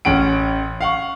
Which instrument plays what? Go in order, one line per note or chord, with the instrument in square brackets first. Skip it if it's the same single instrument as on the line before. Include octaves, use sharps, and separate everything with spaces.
[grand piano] A1 C#4 F#5 D7
F5 F#5 C#6